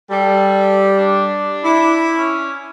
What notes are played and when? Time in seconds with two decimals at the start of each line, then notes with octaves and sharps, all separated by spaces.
0.11 G3 A4
0.97 D4
1.64 E4
2.17 C#4